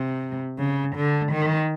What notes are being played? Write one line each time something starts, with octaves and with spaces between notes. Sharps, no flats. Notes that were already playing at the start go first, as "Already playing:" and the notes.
Already playing: C3
C#3
D3
D#3